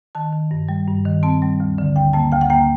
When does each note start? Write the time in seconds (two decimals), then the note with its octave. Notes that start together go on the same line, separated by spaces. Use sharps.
0.15 D#3 A5
0.32 D#3
0.51 G2
0.68 G3
0.87 G2
1.05 D#3
1.23 C4 A5
1.42 G3
1.60 D2
1.78 D3
1.96 D2 G5
2.13 A#3 A5
2.32 D2 G5
2.41 F#5
2.50 A#3 G5